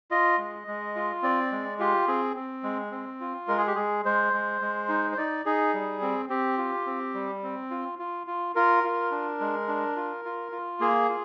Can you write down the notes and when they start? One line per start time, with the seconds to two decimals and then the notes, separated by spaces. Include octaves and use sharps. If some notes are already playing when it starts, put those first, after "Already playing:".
0.11 F4 D#5
0.38 G#3
0.67 G#3
0.96 F4
1.22 C4 D5
1.51 G#3
1.79 F4 G4
2.07 C4 G#4
2.36 C4
2.63 G#3
2.91 C4
3.20 F4
3.48 G#3 A#4
3.58 G#4
3.67 G4
3.75 G#3 G#4
4.05 G#3 C5
4.33 G#3
4.62 G#3
4.89 D#4
5.12 C5
5.18 D#4 D5
5.46 D#4 G#4
5.74 G3
6.02 C4
6.29 C4 G4
6.58 F4
6.86 C4
7.14 G3
7.43 C4
7.71 F4
7.99 F4
8.27 F4
8.55 F4 A#4
8.84 F4
9.11 D4
9.40 G#3
9.68 D4
9.96 F4
10.25 F4
10.52 F4
10.80 A#3 G#4
11.09 F4